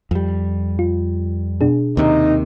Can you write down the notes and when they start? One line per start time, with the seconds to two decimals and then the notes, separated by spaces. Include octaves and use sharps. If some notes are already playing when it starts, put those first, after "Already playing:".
0.11 F2 G3
0.79 F4
1.61 B2 D4 G#4
1.97 D#2 C3 D#3 D#4